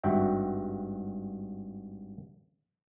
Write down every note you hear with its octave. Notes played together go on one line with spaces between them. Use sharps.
G#1 G2 F#4 E5 F#5 G5